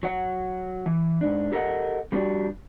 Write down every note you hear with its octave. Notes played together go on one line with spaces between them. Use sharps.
F#3 C#5 F#5
E3
G#2 D4
G4 A4 A#4 C#5 D#5 F#5
G3 A#3 C#4 D4 F#4 G4